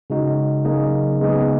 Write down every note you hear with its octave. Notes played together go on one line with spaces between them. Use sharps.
C#3 G#3 D#4 F#4
C#3 F#3 A#3 D#4 G#4
C#3 G#3 B3 D#4 G#4